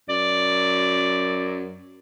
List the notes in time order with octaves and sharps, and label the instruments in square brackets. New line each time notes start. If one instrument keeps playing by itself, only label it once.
[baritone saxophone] F#2 [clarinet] D5